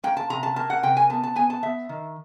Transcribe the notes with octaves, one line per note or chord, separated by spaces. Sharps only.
A#3 G5
A5
C3 A#5
A5
A#3 A5
F#5
C3 G5
G#5
B3 A5
A5
B3 G#5
A5
B3 E5
D#3